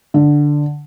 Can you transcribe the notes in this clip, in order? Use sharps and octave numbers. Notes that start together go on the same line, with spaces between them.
D3